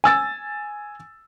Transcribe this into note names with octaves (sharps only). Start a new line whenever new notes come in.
G#5 E6 A6